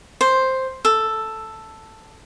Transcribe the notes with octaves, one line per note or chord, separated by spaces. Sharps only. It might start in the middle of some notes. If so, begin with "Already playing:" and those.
C5
A4